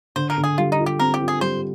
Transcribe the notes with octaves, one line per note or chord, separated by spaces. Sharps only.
D3 C5
A#4
D3
G#4
G3 F4
D#4
F4
G4
C4 A#4
G4
F4
G#4
G3 C5